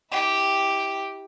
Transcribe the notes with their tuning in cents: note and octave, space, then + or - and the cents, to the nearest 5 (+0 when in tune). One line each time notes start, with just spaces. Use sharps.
E4 -30 G4 +0